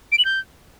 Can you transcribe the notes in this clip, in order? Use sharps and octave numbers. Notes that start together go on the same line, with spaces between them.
D7
F#7
G6